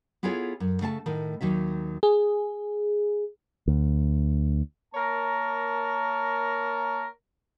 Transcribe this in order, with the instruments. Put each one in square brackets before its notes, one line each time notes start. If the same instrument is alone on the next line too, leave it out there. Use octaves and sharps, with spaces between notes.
[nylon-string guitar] B3 E4 F4 G#4 A4 C#5
F#2
C#3 A3 F5 A5
A2 D#3
D#2 D#3 F#3 E5
[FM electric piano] G#4
[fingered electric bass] D2
[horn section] A#3 A#4 C#5 A5 A#5